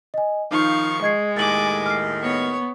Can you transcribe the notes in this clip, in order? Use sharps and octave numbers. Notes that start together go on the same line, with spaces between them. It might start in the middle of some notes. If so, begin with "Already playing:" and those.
D#5 G#5
D#3 F3 D#4 F5 C#6
G#3 D#5 G#6 C7
D#2 A2 D#3 G#5 D6 A6 F#7
F6 C7
B3 C#5 C#6